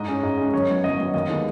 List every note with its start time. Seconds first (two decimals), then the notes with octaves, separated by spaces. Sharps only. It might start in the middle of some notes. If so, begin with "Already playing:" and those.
Already playing: G#2 D#5
0.08 G#3 C#4
0.23 G#2
0.37 G#3 C#4
0.53 F#2 C#5
0.68 F#3 B3
0.84 F#2 D#5
0.98 F#3 B3 D#5
1.14 D#2 D#5
1.29 D#3 G#3 B3